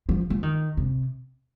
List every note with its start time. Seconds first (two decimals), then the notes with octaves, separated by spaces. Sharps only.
0.09 F3
0.30 F3
0.43 D#3
0.77 C3